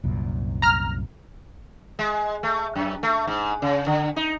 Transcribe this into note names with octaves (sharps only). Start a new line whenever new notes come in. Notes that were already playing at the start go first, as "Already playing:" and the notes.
C2 F#2 A#2
A#5 F6
G#3
A3
F#2
A3
G#2
C#3
D3
D#4